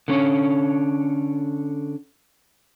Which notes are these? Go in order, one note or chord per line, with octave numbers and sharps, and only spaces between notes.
D3 C#4 C#5